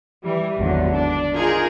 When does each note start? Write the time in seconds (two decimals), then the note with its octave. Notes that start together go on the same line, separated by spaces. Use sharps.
0.23 E3 G3
0.57 G#1 E2 D3 F#3
0.92 D4
1.33 D#4 F4 G#4 A#4